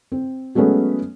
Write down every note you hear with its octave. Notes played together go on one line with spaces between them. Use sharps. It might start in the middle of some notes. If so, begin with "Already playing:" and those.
C4
F#3 G#3 A3 B3 C#4